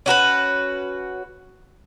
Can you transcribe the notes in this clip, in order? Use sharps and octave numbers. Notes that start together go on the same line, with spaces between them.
C#4 F#4 A#4 B4